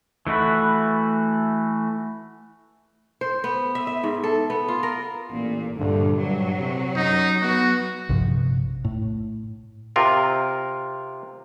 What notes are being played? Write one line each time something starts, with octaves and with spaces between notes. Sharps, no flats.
E3 A3 F#4 B4
C5
B3
E5
E5
G#2
A4
B3
F4
A#4
A1 A#2
A#1 G2 D3
G2 F#3
C3
F#2 D#4
B3 F#4
A#1 G2 C3 F3
A2
C3 F4 A#4